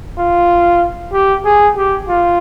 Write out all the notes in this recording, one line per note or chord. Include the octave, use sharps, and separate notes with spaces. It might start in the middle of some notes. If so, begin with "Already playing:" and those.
F4
G4
G#4
G4
F4